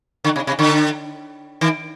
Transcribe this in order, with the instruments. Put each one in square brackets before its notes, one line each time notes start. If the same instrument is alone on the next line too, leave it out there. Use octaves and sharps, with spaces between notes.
[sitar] D3
C3
C3
D3
D#3